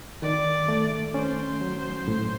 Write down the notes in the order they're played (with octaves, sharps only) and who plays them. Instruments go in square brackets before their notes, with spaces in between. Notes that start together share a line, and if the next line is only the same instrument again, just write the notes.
[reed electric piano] D#3 [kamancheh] D5
[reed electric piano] A3
[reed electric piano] C#4 [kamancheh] C5
[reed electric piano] F#3
A2